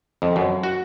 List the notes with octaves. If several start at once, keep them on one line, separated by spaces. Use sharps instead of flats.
F2
F#2
F#4